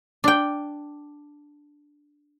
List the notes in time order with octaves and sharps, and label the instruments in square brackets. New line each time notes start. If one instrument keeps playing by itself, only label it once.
[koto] D4 G5